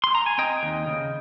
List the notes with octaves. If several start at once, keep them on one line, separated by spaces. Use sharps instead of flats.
C6
A#5
G#5
C4 D#5 G5
D#2
C#3